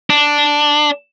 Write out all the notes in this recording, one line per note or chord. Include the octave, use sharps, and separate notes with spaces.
D4